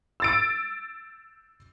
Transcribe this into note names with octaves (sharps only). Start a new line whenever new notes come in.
E6 A6 D7